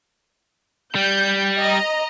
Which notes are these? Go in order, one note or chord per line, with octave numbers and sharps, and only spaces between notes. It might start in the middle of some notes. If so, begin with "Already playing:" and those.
G3 G6
D#5 A#5